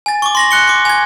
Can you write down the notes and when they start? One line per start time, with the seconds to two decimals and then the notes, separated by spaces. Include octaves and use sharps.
0.06 G#5 A6
0.22 C#6 D6
0.35 C6 A#6 F#7
0.51 F#6 C#7 G7
0.67 C6 D6
0.85 G#5 G#6